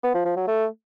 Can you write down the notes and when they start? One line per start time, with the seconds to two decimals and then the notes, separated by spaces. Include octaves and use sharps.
0.03 B3
0.14 F3
0.25 F3
0.36 F#3
0.47 A3